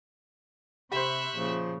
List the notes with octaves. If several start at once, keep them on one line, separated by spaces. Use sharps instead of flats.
C3 G4 C5 E5 B5 C#6 F#6
A#2 C#3 F3